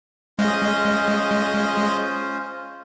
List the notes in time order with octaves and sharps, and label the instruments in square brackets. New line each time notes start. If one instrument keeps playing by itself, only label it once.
[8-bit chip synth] G#3 D#5 [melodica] C#4 F4 C5